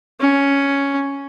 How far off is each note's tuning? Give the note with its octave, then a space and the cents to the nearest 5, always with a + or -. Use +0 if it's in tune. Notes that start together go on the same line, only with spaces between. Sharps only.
C#4 +5